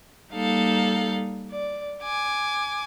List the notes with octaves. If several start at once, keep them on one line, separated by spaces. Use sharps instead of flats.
G3 A#3 D#4 A4 F5
D5
G#5 D6